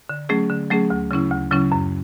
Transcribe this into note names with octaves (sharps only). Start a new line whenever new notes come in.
D3
F#3 A3 C#4 G#4
D3
F#3 A3 C#4 G#4
D2
C#3 F#3 C#4 E4
D2
C#3 F#3 C#4 E4
F#2